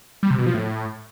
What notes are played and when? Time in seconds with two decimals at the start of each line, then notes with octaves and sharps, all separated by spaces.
0.23 G3
0.31 C3
0.38 B2
0.46 F3
0.54 A2